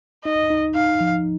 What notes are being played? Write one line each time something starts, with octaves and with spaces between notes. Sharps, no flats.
D#4 D#5
D#4
D#4 F5
F3